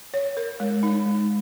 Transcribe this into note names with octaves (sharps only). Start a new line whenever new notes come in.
C#5
A#4
G#3
D#4
G#3